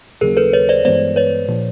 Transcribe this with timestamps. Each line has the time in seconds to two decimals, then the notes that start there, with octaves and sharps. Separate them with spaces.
0.21 D#2 C#3 F#3 A#3 G#4 A#4
0.37 A4 B4
0.53 B4 C#5
0.69 C5 D5
0.85 G2 E3 G#3 B3 C5 D5
1.16 B4 C#5
1.48 A#2 F3